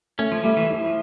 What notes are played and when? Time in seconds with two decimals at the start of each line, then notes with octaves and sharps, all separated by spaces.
0.18 A3 C#4
0.32 F3
0.44 G3 A3
0.57 E3
0.70 F3 E4